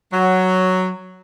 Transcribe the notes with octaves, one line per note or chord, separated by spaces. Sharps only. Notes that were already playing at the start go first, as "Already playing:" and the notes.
F#3